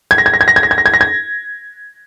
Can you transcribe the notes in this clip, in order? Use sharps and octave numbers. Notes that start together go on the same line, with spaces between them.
G#6
A#6
G#6
A#6
G#6
A#6
G#6
A#6
G#6
A#6
G#6
A#6
G#6